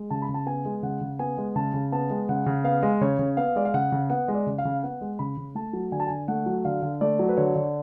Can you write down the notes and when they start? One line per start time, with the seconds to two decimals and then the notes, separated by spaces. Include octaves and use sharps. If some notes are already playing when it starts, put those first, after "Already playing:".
Already playing: G#3
0.10 C#3 A5
0.22 B5
0.29 C#3
0.34 A5
0.46 B3 G#5
0.65 G#3
0.83 C#3 F#5
1.01 C#3
1.19 B3 G#5
1.38 G#3
1.56 C#3 A5
1.74 C#3
1.92 B3 A5
2.10 G#3
2.29 C#3 F#5
2.46 C#3
2.64 B3 F5
2.83 G#3
3.01 C#3 C#5
3.19 C#3
3.37 B3 F5
3.56 G#3 D5
3.65 F5
3.74 C#3 F#5
3.92 C#3
4.10 B3 F#5
4.28 G#3
4.34 D5
4.47 C#3
4.58 F5
4.65 C#3
4.83 B3 F#5
5.01 G#3
5.19 C#3 B5
5.37 C#3
5.55 A3 A5
5.73 F#3
5.92 D3 G#5
6.00 A5
6.07 D3 G#5
6.28 A3 F#5
6.46 F#3
6.65 D3 F5
6.83 D3
7.01 A3 D5
7.19 F#3
7.29 B4
7.37 D3 C#5
7.56 D3